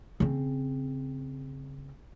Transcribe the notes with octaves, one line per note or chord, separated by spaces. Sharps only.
C#3 C4